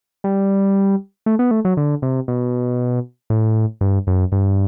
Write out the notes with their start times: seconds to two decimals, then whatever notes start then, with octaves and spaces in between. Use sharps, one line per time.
0.24 G3
1.26 A3
1.39 B3
1.51 A3
1.65 F#3
1.77 D3
2.02 C3
2.28 B2
3.30 A2
3.81 G2
4.07 F#2
4.32 G2